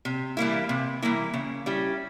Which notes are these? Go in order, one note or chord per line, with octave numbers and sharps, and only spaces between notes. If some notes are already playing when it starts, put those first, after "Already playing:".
C3
E3 G3 A#3 E4
C3
E3 G3 A#3 E4
C#3
G3 C#4 E4 G4